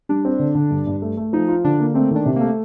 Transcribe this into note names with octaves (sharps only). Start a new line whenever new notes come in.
G3 D4
C4
D3
D3
G2
G2
A3
A3
F3 D#4
F4
D3 D4
A#3
A3 C4
D#3 D4
C3
A3 A#3